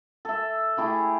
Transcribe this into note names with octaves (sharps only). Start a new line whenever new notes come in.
A4 E5
A3 E4 G4 G#4